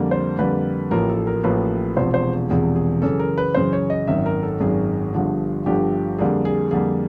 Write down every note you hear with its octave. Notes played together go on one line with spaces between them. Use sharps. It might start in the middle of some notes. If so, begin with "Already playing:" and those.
Already playing: F2 D3 G3 A#3
C5
F2 D3 G3 A#3 B4
A1 A2 F3 A#3 A#4
A4
A#4
A1 A2 F3 A#3 B4
E1 E2 C3 F3 C5
C5
E1 E2 C3 F3 G#4
G#4
F#2 C#3 E3 A4
A#4
B4
F#2 C#3 E3 C5
C#5
D#5
G#1 F#2 D#3 E5
A#4
A4
G#1 F#2 D#3 G#4
G1 G2 D3 F3
G1 G2 D3 F3 G4
F2 D3 G3 A#3 G#4
G#4
F2 D3 G3 A#3 G#4